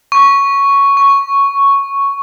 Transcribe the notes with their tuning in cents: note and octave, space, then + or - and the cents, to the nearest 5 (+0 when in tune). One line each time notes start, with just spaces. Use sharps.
C#6 +5
C#6 +0